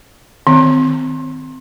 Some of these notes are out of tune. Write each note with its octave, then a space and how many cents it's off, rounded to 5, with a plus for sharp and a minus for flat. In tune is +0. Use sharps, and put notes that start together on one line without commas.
D#3 +0 C4 -25